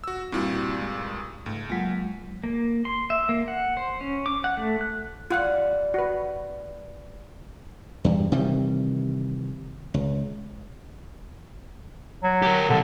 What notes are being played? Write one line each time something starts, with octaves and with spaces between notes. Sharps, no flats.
F#4 E6
G2 A#2 G3 C4 E4 F#4
G#3
D#6
C#2 G#2 A3
F#3 G#3 A#3 F4
A#3
C6
E5
A#3
F#5
C5
C#4
D6
F#5
A3
F#6
E3 G3 F4 F#5
F#4 B4
E2 G2
C3 D#3 E3 G3
C#2
F#3
G4 A#4
B2 D3 F#3